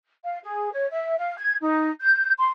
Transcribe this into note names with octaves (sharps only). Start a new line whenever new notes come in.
F5
G#4
C#5
E5
F5
G#6
D#4
G6
C6